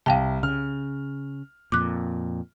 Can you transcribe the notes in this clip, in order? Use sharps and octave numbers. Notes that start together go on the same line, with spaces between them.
C2 F5 G5 A5
C#3 F6
F2 A#2 D6 F#6